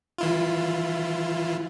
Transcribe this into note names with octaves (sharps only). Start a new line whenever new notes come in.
E3 E4 F4